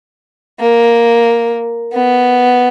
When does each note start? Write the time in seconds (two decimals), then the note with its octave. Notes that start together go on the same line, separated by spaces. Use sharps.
0.60 A#3
1.93 B3